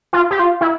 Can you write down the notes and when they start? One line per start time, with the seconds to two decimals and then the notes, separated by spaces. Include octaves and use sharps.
0.13 F4
0.31 G4
0.39 F4
0.61 E4